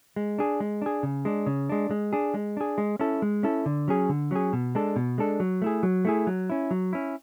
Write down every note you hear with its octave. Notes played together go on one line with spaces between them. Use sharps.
G#3
D4 G#4
G#3
D4 G#4
C#3
G#3 D4
C#3
G#3 D4
G#3
D4 G#4
G#3
D4 G#4
G#3
C#4 E4 A4
G#3
C#4 E4 A4
D3
F#3 C#4 G#4
D3
F#3 C#4 G#4
B2
G#3 D4 A4
B2
G#3 D4 A4
F#3
A3 E4 G#4
F#3
A3 E4 G#4
F#3
C#4 E4
F#3
C#4 E4